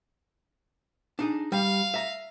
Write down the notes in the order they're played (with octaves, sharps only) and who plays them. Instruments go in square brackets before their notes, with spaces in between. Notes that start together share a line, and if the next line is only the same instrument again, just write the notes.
[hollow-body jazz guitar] D4 D#4 G#4
[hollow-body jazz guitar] G3 [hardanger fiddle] F5
[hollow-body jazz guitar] E5 A#5